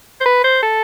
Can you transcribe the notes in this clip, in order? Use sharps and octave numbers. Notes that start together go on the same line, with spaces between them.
C5
B4
C5
A4